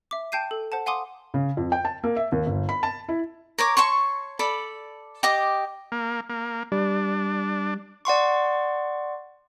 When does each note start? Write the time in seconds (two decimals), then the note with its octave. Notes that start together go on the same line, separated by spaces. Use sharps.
0.11 E5 D6
0.32 G5 A5 G6 C7 D#7
0.51 A4
0.72 C5 F#5 A5
0.86 F5 F#5 G#5 C6 D6 D#6
1.34 C#3
1.57 F2
1.72 G5
1.85 A5
2.04 A#3
2.17 E5
2.32 D#2
2.46 G1
2.69 B5
2.83 A5
3.09 E4
3.58 A#4 C#5 D6
3.77 C#5 A5 C6 C#6
4.39 A4 D5 B5
5.23 G4 D#5 D6
5.92 A#3
6.29 A#3
6.72 G3 D4
8.05 D5 F#5 C6 C#6